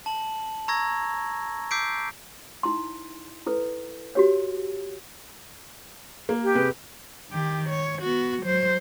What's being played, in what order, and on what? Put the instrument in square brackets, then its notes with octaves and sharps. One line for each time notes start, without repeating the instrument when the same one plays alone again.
[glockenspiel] A5 F#7
A#5 C#6 E6 G#6 A#6
D6 E6 G6 B6 C7 D7
[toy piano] D#4 E4 C6
E4 A4 B4
F#4 G4 C#5
[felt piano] A#3
[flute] G4
[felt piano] C3 G#4 B4
[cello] D#3 G4
C#5
B3 F#4
F#3 C5